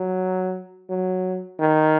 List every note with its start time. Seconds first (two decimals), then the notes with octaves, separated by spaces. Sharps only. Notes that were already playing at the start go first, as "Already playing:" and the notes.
Already playing: F#3
0.89 F#3
1.59 D#3